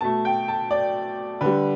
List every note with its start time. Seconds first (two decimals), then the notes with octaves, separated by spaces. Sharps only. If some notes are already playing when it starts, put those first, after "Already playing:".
0.01 B2 A3 A5
0.25 G5
0.48 A5
0.71 D5
1.41 D3 G3 B4